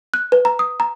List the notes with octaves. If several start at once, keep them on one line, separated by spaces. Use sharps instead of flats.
F#6
B4
A#5
D#6
A#5